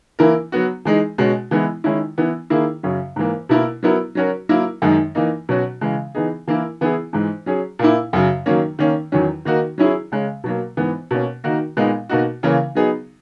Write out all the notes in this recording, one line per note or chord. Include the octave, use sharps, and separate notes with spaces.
E3 A#3 E4 A#4
F#3 B3 F#4
E3 G#3 D#4 G#4
B2 G#3 C#4 F#4
E3 G#3 B3 E4
D#3 G#3 C#4 E4
E3 B3 E4
D#3 A#3 E4 G#4
F#2 C#3 F#3 C#4
G#2 E3 A#3
B2 A#3 E4 A#4
F#3 B3 E4 A#4
F#3 C#4 F#4 A#4
F#3 A#3 E4 A#4
F#2 D#3 G#3 D#4
E3 A#3 D#4
B2 F#3 C#4 F#4
C#3 E3 G#3
E3 B3 D#4 G#4
E3 A#3 E4 A#4
E3 B3 E4 G#4
G#2 E3 G#3
F#3 C#4 G#4
A#2 A#3 E4
F#2 C#3 F#3
D#3 F#3 A#3 C#4
D#3 A#3 C#4
E2 D#3 F#3 C#4
D#3 A#3 D#4 F#4 A#4
F#3 C#4 E4 G#4
C#3 G#3 C#4
B2 F#3 A#3
G#2 E3 B3
B2 A#3 C#4
D#3 A#3 D#4 F#4 A#4
A#2 G#3 B3 D#4
B2 A#3 D#4 F#4
C#3 E3 A#3 C#4
F#3 B3 D#4 G#4